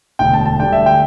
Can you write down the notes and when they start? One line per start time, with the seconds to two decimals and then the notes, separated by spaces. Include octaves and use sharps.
0.19 E1 D2 D3 G5
0.33 A5
0.46 A5
0.59 D2 D3 G3 G5
0.73 E5
0.86 G5